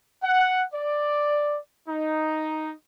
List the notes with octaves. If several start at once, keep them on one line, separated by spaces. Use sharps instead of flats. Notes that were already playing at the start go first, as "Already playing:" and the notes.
F#5
D5
D#4